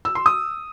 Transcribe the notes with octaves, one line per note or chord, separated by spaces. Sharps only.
E6
C6
D#6